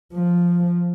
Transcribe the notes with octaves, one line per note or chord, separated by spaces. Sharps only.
F3